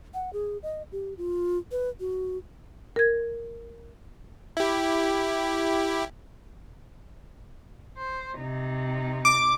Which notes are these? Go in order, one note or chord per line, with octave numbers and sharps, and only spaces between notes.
F#5
G#4
D#5
G4
F4
B4
F#4
A#4 G#6
E4 G4
C5
C3 D#4
D6